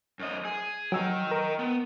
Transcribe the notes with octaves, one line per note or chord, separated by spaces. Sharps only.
F#2 D#5
G#4
F#3 D#5 G5 E6
A#4
B3